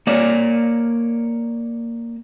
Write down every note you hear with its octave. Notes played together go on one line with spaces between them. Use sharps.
A#3 C#5 D5